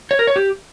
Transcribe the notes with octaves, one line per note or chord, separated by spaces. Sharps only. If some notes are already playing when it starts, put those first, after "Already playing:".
C#5
A#4
C#5
G4